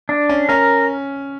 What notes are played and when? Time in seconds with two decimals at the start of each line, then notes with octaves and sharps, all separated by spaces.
0.09 D4
0.29 C#4
0.49 C#4 A#4